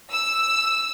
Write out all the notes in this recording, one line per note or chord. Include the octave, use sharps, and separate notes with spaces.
E6